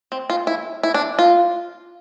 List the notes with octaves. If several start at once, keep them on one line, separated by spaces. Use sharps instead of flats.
C4
F4
E4
E4
D4
F4